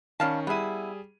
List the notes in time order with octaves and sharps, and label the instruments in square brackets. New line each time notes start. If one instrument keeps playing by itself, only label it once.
[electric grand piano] D#3 C#4 [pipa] G3 F5 A5
[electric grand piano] G3 G#4 D#7 [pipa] B3 E4